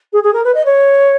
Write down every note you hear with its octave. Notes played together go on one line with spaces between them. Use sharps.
G#4
G#4
A#4
B4
D#5
C#5